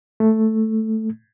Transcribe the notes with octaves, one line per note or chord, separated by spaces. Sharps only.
A3